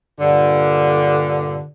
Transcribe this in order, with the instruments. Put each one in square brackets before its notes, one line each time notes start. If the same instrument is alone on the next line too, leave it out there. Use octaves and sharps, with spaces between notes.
[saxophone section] G2 A#2 D3